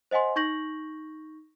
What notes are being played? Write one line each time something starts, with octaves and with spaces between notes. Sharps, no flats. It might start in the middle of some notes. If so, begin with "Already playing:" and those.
C5 D#5 F#5 G#5 C6
D#4 C#6 G6 A#6 F#7